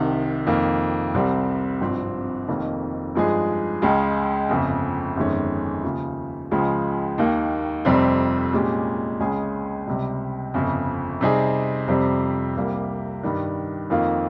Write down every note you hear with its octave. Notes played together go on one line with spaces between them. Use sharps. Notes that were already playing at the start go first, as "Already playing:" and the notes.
Already playing: C2 C3 D#3
F2 D#3 A#3
C2 C3 G3 C4
G#1 G2 F3 C4
F1 F2 D#3 A#3
G2 F3 G#3 D#4 G#4
C#2 C#3 G#3
G1 F2 C#3
G1 F2 D#3 G#3 C#4
D#2 C#3 F3
C#2 C#3 F3 G#3
D#2 D#3 A#3
F1 F2 C3 G3 C4
A#2 G#3 C#4 G4
C#2 C#3 G#3 C#4 G#4
C#2 C3 G3
G1 F2 C#3
C3 G3 C4 D#4 G#4
F2 C3 G3 C4
C2 C3 G3 A#3
G2 D#3 G3
F2 D#3 A#3 F4